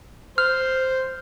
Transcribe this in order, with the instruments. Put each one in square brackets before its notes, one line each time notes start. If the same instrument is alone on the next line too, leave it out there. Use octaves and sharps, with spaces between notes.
[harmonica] C5 [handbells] F6